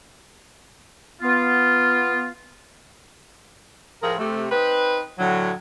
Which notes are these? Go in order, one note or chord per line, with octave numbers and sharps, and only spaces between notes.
B3 F4
A2 F3 G#4 A#4
C3 A3
C4 D#4 B4
A2 D3 F#3